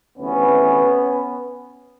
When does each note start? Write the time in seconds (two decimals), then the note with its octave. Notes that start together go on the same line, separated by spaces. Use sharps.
0.17 D2 C3 E3 B3 C#4